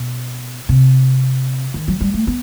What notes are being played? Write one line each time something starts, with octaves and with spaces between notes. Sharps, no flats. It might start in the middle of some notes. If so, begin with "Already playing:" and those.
Already playing: B2
C3
D#3
F#3
G3
A3
B3